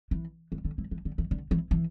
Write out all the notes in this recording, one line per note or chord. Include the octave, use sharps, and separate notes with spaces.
E3
E3
D3
E3
E3
D3
E3
D3
E3
E3